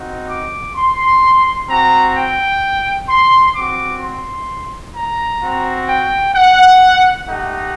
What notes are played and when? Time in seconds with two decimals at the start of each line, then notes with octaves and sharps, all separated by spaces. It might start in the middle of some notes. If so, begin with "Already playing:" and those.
Already playing: C4 D#4 F#4
0.30 D6
0.76 C6
1.69 C4 F#4 A#5
2.16 G5
3.09 C6
3.55 C4 F#4 D6
4.02 C6
4.95 A#5
5.42 C4 F#4
5.88 G5
6.35 F#5
7.27 A3 D#4 G4 F#5